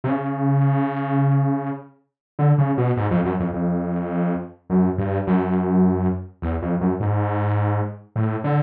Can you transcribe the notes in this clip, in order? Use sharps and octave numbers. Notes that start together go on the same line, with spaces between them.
C3
C#3
D3
C#3
B2
G#2
F2
F#2
F2
F2
F#2
G2
F#2
E2
F2
F#2
G#2
A2
D3